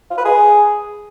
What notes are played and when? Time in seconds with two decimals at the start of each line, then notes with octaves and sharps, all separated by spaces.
0.11 F4
0.18 B4
0.25 G#4